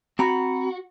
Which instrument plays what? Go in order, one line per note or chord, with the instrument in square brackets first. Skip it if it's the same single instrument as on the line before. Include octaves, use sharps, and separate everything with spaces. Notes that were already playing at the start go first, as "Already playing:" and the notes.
[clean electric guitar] C4 A#5 B5 [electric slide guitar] F#4